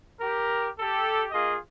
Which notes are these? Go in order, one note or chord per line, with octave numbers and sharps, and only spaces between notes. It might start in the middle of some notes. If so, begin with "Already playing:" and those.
G4 A#4
G4 A4
A#3 F4 G#4 D#5